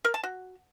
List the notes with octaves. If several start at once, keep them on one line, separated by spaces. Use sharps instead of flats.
A#4
A5
F#4